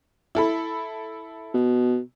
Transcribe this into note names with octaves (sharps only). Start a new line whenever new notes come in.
E4 A4 B5
B2